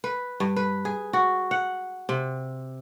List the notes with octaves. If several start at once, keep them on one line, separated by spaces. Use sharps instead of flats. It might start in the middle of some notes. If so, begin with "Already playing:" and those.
B4
G2
B4
G#4
F#4
F#5
C3